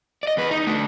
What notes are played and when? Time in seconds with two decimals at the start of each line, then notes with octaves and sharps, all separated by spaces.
0.23 D5 D#5
0.37 E2 B4
0.51 D#4
0.67 A3 D4